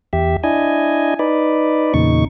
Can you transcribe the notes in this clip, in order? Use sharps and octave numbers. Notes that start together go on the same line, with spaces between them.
E2 G4 E5
D4 E4 D#5 G#5
D#4 B4 D5
E2 A#2 C#3 D#4 C#6